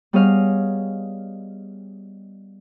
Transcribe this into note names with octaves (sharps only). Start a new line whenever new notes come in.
G3 B3 G#4 C#5 D#5 F5